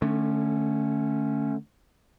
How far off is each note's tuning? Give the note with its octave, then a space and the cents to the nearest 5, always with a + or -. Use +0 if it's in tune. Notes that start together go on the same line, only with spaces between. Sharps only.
D3 +30 A3 +0 C#4 +5